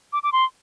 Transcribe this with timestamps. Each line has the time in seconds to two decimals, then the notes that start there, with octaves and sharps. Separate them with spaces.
0.13 D6
0.23 D6
0.32 C6